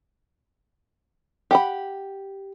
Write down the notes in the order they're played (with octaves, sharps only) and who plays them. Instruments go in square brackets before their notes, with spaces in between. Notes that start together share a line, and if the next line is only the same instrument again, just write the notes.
[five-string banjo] G4 F#5 B5